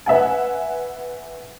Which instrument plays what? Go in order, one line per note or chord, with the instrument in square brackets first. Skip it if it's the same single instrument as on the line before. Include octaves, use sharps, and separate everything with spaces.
[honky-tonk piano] B4 E5 F#5 G#5